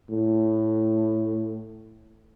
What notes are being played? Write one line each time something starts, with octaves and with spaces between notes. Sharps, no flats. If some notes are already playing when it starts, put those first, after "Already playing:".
A2